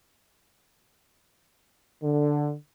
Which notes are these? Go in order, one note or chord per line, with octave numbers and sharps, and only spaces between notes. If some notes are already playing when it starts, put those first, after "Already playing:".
D3